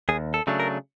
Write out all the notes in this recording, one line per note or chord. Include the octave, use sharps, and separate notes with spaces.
D#2 G#4
A4
C#3 F#3 A3 D4
A#4